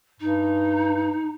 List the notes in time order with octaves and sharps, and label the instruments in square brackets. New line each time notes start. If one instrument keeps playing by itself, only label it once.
[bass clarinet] G2 [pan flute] D#4